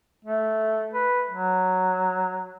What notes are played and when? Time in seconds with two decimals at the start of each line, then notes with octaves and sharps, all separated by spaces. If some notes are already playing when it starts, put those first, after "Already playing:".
0.25 A3
0.94 B4
1.30 F#3